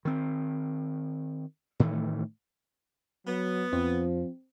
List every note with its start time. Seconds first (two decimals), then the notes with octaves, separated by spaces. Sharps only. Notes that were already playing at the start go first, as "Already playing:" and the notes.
0.05 D#3 C4
1.80 A2 D#3 E3 A3
3.27 F#3 B3
3.73 F2 F3 C4